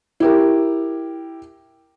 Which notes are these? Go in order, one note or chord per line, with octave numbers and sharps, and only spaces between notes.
E4 G4 A#4